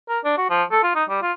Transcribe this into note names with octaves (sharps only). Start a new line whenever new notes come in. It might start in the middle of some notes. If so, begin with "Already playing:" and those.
A#4
D4
F#4
F3
A4
F4
D#4
G3
F4